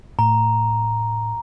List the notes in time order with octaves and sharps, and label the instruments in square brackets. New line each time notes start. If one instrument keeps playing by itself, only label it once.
[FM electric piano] A2 [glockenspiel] A#5